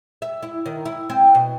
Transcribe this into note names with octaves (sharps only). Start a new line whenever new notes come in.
E5
E4
D#3
E4
C4
B2